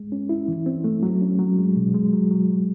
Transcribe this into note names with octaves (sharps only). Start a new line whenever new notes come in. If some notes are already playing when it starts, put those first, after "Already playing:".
Already playing: G#3
C#4
E4
E3
C4
A3
F#3
C#4
F#3
G#3
B2
G#3
F#3
F#3
F#3